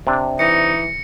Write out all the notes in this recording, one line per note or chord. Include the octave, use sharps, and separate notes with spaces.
C3 D4
E3 D#4 A#6 C#7